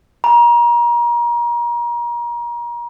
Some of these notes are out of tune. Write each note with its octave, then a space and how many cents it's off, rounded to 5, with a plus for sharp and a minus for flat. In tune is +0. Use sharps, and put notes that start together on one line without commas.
A#5 +30